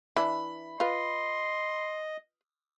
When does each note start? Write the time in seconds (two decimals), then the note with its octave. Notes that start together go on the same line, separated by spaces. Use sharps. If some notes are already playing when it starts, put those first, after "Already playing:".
0.16 E3 D4 B5
0.80 F4 B4 D#5 C6